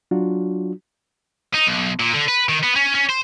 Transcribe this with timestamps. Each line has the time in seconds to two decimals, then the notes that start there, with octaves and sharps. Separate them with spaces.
0.11 F#3 D4 F4 F#4
1.54 D#4
1.67 B1
2.00 A#2
2.14 D3
2.28 B4
2.49 D#3
2.63 B3
2.76 C#4
2.95 C#4
3.10 C5